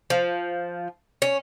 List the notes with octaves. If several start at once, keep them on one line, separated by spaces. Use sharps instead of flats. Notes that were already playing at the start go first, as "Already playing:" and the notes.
F3
C#4